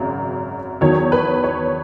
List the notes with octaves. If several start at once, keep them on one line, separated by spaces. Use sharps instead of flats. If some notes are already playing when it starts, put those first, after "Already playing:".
Already playing: G#1 F#2 C#3
E2 D#3 F#3 C#5
B4
C#5